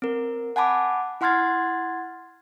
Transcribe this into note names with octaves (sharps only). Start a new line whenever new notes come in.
C4 A#4
F#5 G#5 A5 B5 D6
E4 F#5 C6 F6 G#6 A6